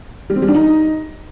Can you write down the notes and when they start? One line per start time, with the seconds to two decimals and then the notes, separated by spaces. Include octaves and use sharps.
0.30 G3
0.36 C4
0.42 G3
0.48 D4
0.55 D#4